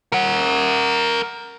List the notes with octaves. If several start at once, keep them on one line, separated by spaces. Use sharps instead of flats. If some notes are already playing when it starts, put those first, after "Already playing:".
A#4 F#5